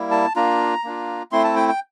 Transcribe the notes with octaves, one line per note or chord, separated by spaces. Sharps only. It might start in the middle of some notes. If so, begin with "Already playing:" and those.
Already playing: G3 A#3 E4
A5
A#3 D4 F4 A#5
A#3 D4 F4
A3 C4 E4 C6
A5
G5
G5